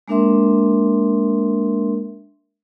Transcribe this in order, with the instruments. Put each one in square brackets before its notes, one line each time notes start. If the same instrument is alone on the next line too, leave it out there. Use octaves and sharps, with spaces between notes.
[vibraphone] G#3 A#3 D4 A#4 E5 C6